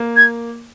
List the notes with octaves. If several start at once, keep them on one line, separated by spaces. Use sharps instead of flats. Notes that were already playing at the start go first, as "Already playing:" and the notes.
Already playing: A#3
G#6